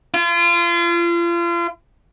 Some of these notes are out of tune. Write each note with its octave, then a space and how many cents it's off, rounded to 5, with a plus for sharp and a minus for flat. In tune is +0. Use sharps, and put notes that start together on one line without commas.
F4 -35